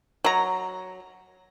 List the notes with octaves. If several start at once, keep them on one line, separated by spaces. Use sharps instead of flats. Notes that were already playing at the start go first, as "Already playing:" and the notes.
F#3 A#5